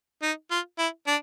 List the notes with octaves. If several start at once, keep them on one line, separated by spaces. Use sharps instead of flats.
D#4
F4
E4
D4